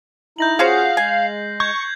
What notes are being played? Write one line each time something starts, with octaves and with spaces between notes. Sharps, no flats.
D#4 E4 G6 A#6 F#7
C#4 F4 F#4 G#4 C5 F5 F#5 C7
G#3 G#5
C#6 G6 G#6